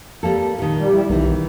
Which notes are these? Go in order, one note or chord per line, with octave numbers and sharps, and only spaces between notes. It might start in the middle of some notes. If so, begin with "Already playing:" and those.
G3 A#3 A4
A#2 D#3
G3
E4
B1 D#3 E3